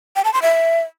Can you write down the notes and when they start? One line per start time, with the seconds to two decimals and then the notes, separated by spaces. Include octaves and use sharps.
0.16 G5
0.25 A5
0.33 C6
0.42 E5